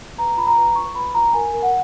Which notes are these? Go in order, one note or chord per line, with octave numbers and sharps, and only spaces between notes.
B4 A#5
F4 B5
A#5
B4
F4 C#6
B4 B5
F4 A#5
A#4 G#5
A#4
F#5